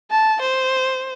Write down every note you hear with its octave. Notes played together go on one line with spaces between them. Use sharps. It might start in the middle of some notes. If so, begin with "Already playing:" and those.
A5
C5